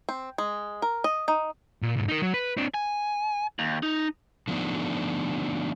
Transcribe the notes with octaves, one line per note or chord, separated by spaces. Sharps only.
C4
G#3
A#4
D#5
D#4
A#2
B1 G#2
D#4 A#4
F#3
B4
C4 D4
G#5
D#2
D#4
D3 F3 A3 B3 D4 D#4